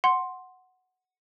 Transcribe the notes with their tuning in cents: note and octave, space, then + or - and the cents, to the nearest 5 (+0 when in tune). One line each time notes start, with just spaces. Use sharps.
F#5 +0 C6 +5